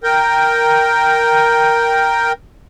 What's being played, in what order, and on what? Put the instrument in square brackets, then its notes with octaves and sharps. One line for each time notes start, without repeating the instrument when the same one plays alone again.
[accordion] A#4 G5